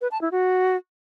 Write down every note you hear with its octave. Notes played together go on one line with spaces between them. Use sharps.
B4
A5
E4
F#4